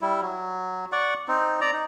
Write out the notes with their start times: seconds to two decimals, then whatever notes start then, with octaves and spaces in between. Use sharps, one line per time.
0.01 G3 E4
0.22 F#3
0.92 D5 F#5 C#6
1.28 C4 D#4
1.61 D5 A#5
1.73 D#4